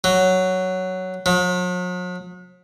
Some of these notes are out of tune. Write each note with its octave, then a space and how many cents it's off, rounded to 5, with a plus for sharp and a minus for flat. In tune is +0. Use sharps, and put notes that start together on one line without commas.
F#3 +5
F#3 -45